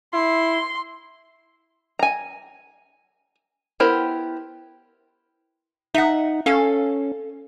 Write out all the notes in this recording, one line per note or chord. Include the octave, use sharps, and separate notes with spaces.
E4 C6
G#5 A#5
B3 E4 G4 A#4 C5
D#4 E5 F#5
C#4 A4 F5